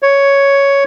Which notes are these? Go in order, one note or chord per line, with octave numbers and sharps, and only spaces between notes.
C#5